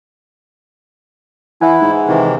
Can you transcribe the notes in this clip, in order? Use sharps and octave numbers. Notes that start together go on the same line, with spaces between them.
E3 E4 E5 F#5 G#5
G#2
C3 D#3 E3